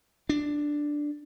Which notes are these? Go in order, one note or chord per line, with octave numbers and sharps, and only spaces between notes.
D4